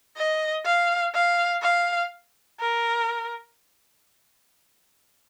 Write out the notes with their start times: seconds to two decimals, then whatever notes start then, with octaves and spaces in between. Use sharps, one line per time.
0.16 D#5
0.66 F5
1.14 F5
1.62 F5
2.60 A#4